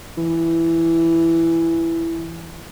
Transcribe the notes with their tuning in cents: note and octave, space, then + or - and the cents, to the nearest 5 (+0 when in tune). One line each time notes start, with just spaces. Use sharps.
E3 +10